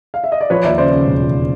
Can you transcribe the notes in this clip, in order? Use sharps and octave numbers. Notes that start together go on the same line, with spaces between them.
F5
E5
D#5
D5
F3 B4 C#5
D#2 D5 E5
C#3 C5 D5
C#3
E1
F3